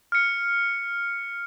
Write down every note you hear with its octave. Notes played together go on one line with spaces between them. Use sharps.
F6 C#7